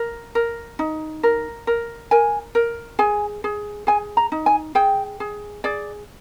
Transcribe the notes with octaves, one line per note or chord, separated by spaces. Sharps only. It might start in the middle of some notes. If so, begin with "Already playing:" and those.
Already playing: A#4
A#4
D#4
A#4
A#4
A#4 G#5
A#4
G#4 G#5
G#4
G#4 G#5
A#5
D#4
G#5
G#4 G5
G#4
G#4 D5